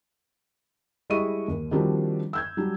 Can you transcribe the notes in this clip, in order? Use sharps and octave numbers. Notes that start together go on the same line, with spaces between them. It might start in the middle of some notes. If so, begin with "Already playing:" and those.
G3 G#3 E4 D#5 C#6 D#7
D#2
D#3 F3 G3 C4 D4 F#4
E6 G6 G#6
F#3 G3 D4